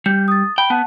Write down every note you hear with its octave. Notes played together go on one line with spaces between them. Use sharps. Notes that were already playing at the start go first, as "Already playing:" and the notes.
G3 G6
D#6 A6
G5 B5
B3 F#5 A5